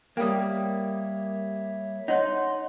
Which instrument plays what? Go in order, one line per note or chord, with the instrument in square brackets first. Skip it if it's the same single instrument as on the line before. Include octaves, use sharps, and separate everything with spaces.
[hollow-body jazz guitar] G3 A#3 [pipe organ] C#5 E5 [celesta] G5 D#6
[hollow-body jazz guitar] D#4 [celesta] C#5 D#5 F#5 [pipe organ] C6